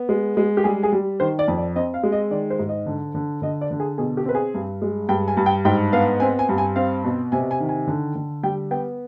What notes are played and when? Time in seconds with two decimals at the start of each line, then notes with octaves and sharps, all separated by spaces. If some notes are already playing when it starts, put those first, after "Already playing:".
Already playing: B3
0.09 G#3
0.37 G#3
0.57 G4
0.64 G3 G#4
0.83 G#4
0.93 G3
1.20 D#3 C5
1.39 D5
1.48 F2
1.58 D5
1.76 C4 D#5
1.94 F5
2.03 G#3
2.12 D#5
2.31 D#3 D5
2.50 C5
2.59 G#2
2.69 D#5
2.86 D3
3.15 D3
3.42 D3 D#5
3.61 D5
3.71 D3
3.80 G#4
3.98 B2 G#4
4.17 G4
4.25 C4 B4
4.35 G#4
4.54 G2
4.82 G#3
5.09 G2 G5
5.28 G#5
5.37 G2
5.46 G5
5.65 G#2 G5
5.92 B3 F5
6.20 C4 G#5
6.39 G#5
6.49 G2
6.58 G#5
6.76 C4 F5
7.04 B2
7.32 C3 G#5
7.51 G#5
7.60 D#3
7.69 G#5
7.87 D3
8.15 D3
8.43 G3 G5
8.71 B3 G5